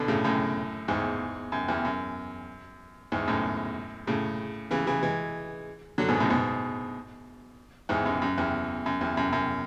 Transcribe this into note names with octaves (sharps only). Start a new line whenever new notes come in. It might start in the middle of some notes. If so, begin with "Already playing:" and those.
Already playing: B2 D3
A2 C#3
F#2 A2
E2 G#2
F#2
E2
F#2
E2 G#2
F#2 A2
A2 C#3
C#3 E3
C#3 E3
E3 G#3
D3 F#3
G#2 B2
F#2 A2
G#2 B2
E2 G#2
F#2
F#2
E2
F#2
E2
F#2
F#2